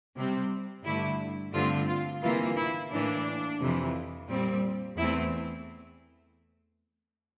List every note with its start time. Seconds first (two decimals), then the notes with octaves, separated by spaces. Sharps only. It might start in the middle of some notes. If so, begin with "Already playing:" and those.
0.15 C3 G3 C4
0.83 G2 D3 A3 E4
1.53 G2 D3 A3 C4 F4
1.87 F4
2.22 C3 E3 A#3 F4
2.56 E4
2.90 A2 E3 A#3 D4
3.59 F2 C3 E3
4.28 A#2 G3 C4
4.97 E2 E3 A3 C4 E4